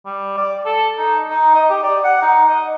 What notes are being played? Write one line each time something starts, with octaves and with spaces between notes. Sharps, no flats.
G3
D5
A4
D#4
D#4
D#5
G4
D5
F#5
D#4
D#5